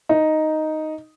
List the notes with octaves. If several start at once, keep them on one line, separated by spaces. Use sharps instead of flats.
D#4